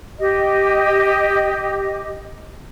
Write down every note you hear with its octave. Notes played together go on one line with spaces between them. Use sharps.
G4 D#5